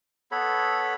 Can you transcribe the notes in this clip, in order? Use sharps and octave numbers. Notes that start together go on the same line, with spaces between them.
B3 A4 C#5 B5